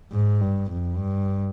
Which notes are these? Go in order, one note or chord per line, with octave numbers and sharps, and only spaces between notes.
G#2
G2
F2
G2